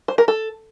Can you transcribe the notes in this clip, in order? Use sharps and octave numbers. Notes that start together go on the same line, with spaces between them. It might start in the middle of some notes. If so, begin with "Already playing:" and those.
C5
A#4
A4